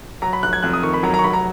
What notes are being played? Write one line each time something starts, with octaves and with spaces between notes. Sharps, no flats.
F#3 A#5
B5
F1 F#6
G#6
F2 F#6
D#6
D#3 C#6
B5
F#3 A#5
A#5
C#6
F1 B5
A#5